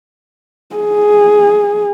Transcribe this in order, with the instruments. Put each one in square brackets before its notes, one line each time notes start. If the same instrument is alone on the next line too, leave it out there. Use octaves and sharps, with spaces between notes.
[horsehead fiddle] G#4